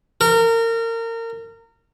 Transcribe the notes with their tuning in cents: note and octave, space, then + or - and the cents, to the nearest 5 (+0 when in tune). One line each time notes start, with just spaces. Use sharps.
A#4 -30